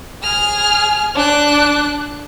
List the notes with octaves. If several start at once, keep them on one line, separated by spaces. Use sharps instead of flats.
G#4 F6
D4 F#6